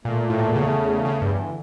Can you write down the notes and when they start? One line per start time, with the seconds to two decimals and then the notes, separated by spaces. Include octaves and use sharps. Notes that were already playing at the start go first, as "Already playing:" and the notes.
0.05 A#2 A3
0.22 A3
0.30 A2
0.38 E2 A#2
0.55 C#3 A3
0.72 E2
0.88 A3
1.05 E2 C#3
1.22 G2 E3
1.38 D3